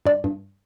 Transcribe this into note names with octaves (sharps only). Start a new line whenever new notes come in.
G2 D5
G2